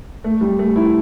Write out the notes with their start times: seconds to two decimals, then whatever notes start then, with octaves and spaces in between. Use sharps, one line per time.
0.24 A3
0.41 G3
0.59 A3
0.76 E4